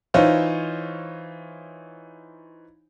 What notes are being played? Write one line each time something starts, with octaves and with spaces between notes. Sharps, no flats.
E3 D#4 F4 C5 C#5